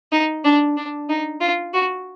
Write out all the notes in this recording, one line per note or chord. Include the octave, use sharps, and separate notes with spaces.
D#4
D4
D4
D#4
F4
F#4